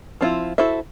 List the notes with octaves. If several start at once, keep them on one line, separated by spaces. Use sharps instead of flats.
F3 C4 D4 E4 F4
E4 F#4 A4 C5 E5